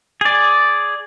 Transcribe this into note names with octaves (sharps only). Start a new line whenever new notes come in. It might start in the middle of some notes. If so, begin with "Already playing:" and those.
G#4 D5